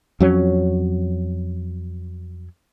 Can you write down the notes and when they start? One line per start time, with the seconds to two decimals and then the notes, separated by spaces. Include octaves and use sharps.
0.20 F2 F#3 C#4